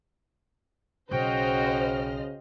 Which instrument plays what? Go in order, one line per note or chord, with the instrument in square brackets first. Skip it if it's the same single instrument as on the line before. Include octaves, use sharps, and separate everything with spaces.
[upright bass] B1 [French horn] C#3 [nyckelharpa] F#4 G5 [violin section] C5 D#5 F6